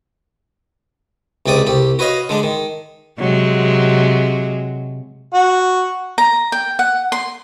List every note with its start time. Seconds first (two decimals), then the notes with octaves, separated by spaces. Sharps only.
1.46 C#2 C3 G4 D5 D#6
1.67 C2 G4
1.99 F#4 B4 C#5 D#5 F5
2.29 D3 G#3 D4
2.43 D#3
3.20 C3 F#3 G#3
5.34 F#4
6.18 A#5
6.52 G5
6.79 F#5
7.12 C6